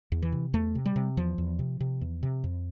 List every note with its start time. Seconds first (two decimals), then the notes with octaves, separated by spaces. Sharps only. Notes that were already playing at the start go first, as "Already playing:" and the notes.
0.12 E2
0.22 E3
0.32 C3
0.53 E2 A3
0.75 C3
0.86 G3
0.96 C3
1.17 E2 F3
1.38 E2
1.59 C3
1.80 C3
2.01 E2
2.23 C3
2.44 F2